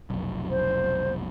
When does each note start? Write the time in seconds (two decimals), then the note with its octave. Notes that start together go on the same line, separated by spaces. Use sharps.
0.10 F1 B1
0.50 C5